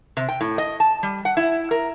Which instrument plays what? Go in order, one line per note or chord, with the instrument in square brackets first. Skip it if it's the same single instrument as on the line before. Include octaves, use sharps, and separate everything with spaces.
[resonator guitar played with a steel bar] C3
G5
A2
D#5
A5
G3
F#5
E4
A#4